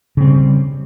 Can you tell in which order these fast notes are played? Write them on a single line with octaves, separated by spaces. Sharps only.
C#3 C4 G3